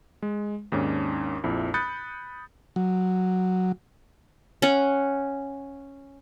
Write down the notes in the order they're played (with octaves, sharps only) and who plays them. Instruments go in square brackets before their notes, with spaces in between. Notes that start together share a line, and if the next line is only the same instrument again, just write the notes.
[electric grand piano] G#3
D#2 G#2 C#4 D4
A#1 F2 E4
B5 D#6 F#6 G6 A6 C#7
[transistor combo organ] F#3
[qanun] C#4 F#5